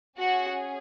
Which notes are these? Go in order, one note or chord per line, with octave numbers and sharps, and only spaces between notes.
C#4 F#4 G#4 F#5